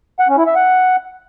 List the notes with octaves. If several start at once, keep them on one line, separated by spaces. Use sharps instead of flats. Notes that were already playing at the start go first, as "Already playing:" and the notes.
F#5
C#4
E4
E5
F#5